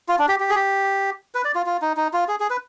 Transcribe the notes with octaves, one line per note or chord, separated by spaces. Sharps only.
F4
D4
G4
G4
G#4
G4
B4
D5
F4
F4
D#4
D#4
F4
G#4
G#4
B4